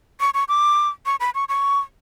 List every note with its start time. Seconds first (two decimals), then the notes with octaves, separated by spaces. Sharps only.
0.20 C#6
0.34 C#6
0.48 D6
1.06 C#6
1.20 B5
1.35 C#6
1.49 C#6